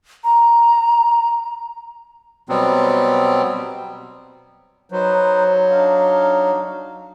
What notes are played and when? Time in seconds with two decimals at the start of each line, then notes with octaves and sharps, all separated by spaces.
0.24 A#5
2.49 B2 F#3 G3 B3 C4
4.92 F#3 D#4 B4 C5
5.70 D4 D#4 F5